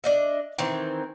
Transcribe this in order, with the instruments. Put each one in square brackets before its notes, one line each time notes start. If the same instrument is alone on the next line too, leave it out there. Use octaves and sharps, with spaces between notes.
[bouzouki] D4 D#5 E5
D#3 E3 C4